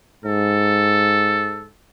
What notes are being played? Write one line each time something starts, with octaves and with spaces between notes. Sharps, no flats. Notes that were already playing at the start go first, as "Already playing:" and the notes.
G#2 A4